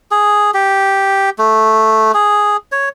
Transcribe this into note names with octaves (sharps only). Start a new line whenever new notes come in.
G#4
G4
A3
G#4
C#5